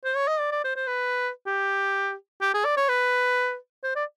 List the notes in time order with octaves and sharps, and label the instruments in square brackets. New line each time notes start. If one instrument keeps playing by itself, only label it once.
[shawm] C5
C#5
D#5
D5
D5
C5
C5
B4
G4
G4
G#4
D5
C#5
B4
C5
D5